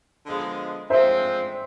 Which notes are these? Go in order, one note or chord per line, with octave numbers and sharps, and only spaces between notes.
D3 F3 G#3 B3
F3 G#3 C4 C5 E5